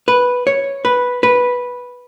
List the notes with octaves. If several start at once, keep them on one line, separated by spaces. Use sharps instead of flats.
B4
C#5
B4
B4